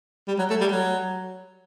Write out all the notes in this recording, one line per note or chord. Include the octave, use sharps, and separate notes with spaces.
G3
F#3
A3
G3
F#3